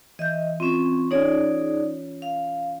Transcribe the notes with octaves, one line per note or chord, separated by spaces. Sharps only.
E3 D#5 E5 G6
C4 C#4 F4
C#4 D#4 G#4 C#5 D5
F5